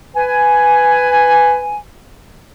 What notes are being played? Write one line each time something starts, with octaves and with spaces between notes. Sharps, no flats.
B4 G#5